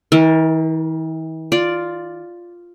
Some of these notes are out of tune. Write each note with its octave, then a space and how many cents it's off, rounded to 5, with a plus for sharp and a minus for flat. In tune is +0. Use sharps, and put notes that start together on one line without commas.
E3 -45 A#4 +5
F4 +0 D5 +0